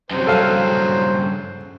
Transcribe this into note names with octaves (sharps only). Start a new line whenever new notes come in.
F#2 C3 F#3 C5
G2 C#3 A4 F5